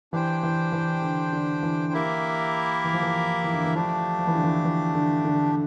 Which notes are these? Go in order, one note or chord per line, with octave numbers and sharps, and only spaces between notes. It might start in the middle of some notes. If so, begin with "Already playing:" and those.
E3 D4 G4 C5 G5
E3
E3
D3
D3
E3
A#3 E4 G4 A#4 E5
E3
F3
E3
E3
D3
E3
F3 A3 D4 G4
F3
E3
D3
E3
E3
D3
D3